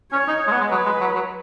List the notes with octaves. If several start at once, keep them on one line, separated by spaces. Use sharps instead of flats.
C#4 C#5
D#4
G#3
B3
G#3
F#3 B4
G#3
F#3
F#3